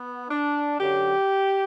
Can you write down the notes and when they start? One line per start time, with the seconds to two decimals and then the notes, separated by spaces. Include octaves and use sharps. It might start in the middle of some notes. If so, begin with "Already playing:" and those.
Already playing: B3
0.29 D4
0.78 F#2 D3 F#3 G4